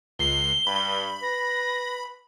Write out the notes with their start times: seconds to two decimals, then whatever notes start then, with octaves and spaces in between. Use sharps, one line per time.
0.19 C#2 C7 G7
0.67 G2 B5
1.23 B4 A#6